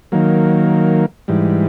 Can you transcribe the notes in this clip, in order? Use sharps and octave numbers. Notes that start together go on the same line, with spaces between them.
D#3 F#3 A#3
G#2 E3 G3